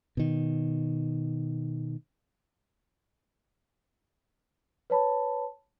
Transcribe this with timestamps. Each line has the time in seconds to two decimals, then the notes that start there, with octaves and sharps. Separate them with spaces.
0.17 B2 D#3
4.90 B4 C#5 A5 B5